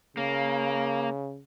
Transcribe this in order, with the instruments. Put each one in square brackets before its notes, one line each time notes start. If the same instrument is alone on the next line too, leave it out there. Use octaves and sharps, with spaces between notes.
[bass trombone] C#3 [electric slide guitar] A#3